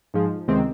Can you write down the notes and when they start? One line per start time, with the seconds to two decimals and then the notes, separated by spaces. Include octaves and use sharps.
0.14 G#2 F3 G#3
0.47 C#2 C3 D#3 G#3 C4